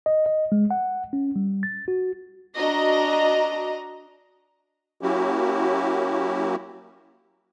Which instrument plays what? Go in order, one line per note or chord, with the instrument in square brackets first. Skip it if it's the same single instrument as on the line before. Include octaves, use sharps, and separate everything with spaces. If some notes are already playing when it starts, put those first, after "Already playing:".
[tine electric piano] D#5
D#5
G#3
F#5
C#4
G3
A6
F#4
[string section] D4 F#4 D#5 A#5
[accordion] F#3 A#3 C#4 E4 F#4 G4